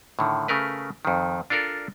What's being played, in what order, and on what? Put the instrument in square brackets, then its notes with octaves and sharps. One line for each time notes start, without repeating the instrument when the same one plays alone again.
[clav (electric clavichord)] A2 D3 D#3
C#3 A3 A#4 B4
F2 D#3
D4 F4 A4 A#4 D5